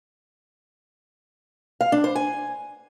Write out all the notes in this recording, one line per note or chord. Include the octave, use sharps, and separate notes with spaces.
F5
D4
C5
G#5